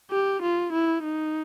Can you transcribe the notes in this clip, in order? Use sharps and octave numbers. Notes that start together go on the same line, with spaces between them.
G4
F4
E4
D#4